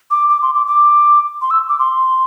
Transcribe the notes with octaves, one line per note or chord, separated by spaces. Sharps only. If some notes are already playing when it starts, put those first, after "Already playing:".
D6
D6
C6
D6
D6
C6
E6
D6
C6